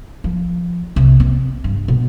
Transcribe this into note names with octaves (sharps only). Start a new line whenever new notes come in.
F3
C2
C4
G2
B2